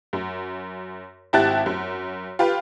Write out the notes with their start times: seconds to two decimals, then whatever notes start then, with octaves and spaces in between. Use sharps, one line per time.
0.13 F#2
1.33 G#1 E4 G4 A5 F#6 A6
1.66 F#2
2.39 F4 G4 B4